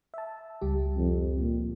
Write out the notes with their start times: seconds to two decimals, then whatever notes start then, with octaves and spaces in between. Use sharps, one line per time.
0.14 E5 A5
0.61 C#2 G3 G4
0.97 F2
1.40 A#2